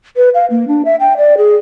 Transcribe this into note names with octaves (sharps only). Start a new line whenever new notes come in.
B4
F5
A#3
D4
E5
G5
D5
G#4